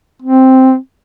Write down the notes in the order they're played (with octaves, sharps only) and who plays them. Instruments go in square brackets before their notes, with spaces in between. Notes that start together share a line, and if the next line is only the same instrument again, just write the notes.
[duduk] C4